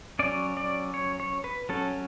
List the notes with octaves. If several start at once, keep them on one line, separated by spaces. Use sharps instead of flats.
F#3 C#4 D5
D5
C#5
C#5
B4
F#3 C#4 A4